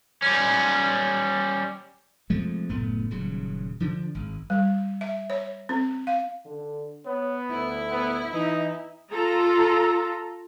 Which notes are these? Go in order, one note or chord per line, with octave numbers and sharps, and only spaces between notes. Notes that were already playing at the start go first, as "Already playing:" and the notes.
G3 C#4
C3 F3 G#3 A3
F#1 A2 A3 B3
D#1 C#3 F#3
D3 F3 D4
G#1
G3
E5
C#5
C4
F5
D3
B3 C#5
D2 E4
B3
E3 D#4
F4 A4 A#5